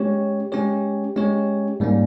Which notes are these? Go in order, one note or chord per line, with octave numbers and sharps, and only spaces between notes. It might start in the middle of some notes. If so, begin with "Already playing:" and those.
Already playing: G#3 C#4 G4 C#5
G#3 C#4 G4 C#5
G#3 C#4 G4 C#5
G#2 G3 A#3 C#4